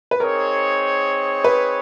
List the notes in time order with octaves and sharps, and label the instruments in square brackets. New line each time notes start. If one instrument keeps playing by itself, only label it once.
[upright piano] B4
[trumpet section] C4 D#4 G#4 C#5 [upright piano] A#4
[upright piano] B4